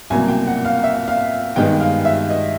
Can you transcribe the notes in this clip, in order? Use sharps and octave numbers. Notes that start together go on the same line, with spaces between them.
C2 B2 F#3 A#3 G#5
G5
F#5
F5
E5
F5
G2 D#3 G#3 B3 G5
F5
E5
D#5